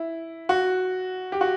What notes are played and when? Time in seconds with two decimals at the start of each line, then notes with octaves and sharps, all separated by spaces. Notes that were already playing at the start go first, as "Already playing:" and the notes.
Already playing: E4
0.49 F#4
1.32 G4
1.41 F#4